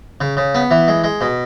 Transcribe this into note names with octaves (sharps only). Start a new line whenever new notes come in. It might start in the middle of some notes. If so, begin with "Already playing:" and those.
C#3
C#3
B3
E3
G#3
G#3
B2